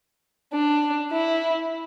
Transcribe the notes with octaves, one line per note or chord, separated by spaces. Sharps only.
D4
E4